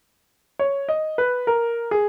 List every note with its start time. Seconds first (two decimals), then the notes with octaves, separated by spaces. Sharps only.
0.59 C#5
0.89 D#5
1.18 B4
1.47 A#4
1.91 G#4